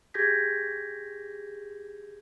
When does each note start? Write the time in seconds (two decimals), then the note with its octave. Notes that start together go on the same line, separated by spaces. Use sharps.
0.14 G4 G#4 G6 G#6 A#6 B6